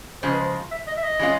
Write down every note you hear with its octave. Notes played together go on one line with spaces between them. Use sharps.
C#3 F3 G#3 C5
B4
C5
E5
D#5
E5
D#5
E3 G#3 C#4 F4